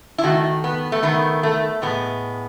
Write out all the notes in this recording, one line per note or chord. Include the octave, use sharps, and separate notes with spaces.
E4
D#3 A3 F#4
B3
A3
D#3 A3 B3
A3
A2 G#3 B3